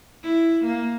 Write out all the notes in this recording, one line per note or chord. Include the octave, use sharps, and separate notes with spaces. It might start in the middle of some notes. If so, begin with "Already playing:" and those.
E4
A#3